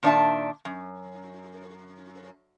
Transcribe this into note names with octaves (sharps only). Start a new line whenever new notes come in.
A#2 D#3 D4 B4 E5 A5
F#2